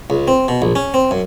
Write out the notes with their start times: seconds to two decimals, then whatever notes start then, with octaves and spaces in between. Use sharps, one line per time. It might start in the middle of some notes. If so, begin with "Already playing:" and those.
0.10 C#2
0.28 C4
0.48 B2
0.62 A#1
0.76 C#4
0.94 C4
1.11 F#2